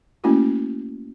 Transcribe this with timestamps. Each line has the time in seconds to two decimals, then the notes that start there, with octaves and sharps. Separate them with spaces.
0.24 A3 A#3 C#4 E4 F#4